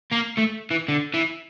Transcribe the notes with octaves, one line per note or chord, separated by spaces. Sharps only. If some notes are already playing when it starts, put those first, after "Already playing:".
A#3
A3
E3
D3
E3